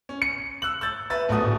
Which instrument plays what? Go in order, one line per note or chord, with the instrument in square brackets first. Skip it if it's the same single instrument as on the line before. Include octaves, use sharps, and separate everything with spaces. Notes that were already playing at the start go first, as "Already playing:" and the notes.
[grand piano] C#4
C#7
E6 F#6 F#7
E6 G6 A6
B4 E5 A6
D1 A#1 A3 B3 F#4 D#6